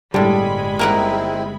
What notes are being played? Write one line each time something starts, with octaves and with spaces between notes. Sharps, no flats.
G1 A2 D3 G3 G#3 B5
D#3 A#3 C4 E4 A#4 F#5